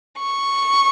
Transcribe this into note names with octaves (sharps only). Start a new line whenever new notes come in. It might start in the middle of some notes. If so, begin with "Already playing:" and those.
C#6